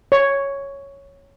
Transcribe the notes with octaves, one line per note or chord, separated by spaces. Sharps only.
C#5